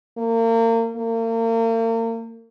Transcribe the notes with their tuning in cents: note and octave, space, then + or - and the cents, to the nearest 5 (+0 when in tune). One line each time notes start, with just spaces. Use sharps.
A#3 -35
A#3 -40